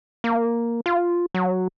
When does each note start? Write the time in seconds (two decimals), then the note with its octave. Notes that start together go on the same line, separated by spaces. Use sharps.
0.24 A#3
0.86 F4
1.34 F#3